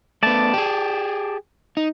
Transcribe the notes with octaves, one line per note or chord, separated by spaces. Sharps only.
A3 B3 D5 A5
G4 G#4
D#4